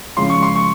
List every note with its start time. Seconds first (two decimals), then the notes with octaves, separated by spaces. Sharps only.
0.17 C#3 F3 G#3 C#4 C6
0.30 C#6
0.42 C6
0.55 C#6